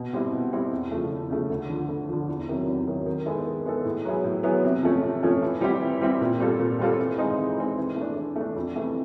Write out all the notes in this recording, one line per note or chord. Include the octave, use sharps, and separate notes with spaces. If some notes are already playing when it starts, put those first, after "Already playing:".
Already playing: B2
G3 C4 E4
B2
G3 C4 E4
E2
C#3 F3 A3
E2
C#3 F3 A3
D2
D3 F3
D2
D3 F3
E2
C3 D#3 F#3
E2
C3 D#3 F#3
D#3
G#3 B3 E4 A4
D#3
G#3 B3 E4 A4
A2
F#3 B3 E4 G#4
A2
F#3 B3 E4 G#4
C3
F3 A3 C#4
C3
F3 A3 C#4
E3
G3 C4 E4 G4
E3
G3 C4 E4 G4
A#2
G3 C4 F4 A4
A#2
G3 C4 F4 A4
E3
G#3 C4 D#4
E3
G#3 C4 D#4
E3
A3
D4
E3
A3
D4
F2
C3 E3 A3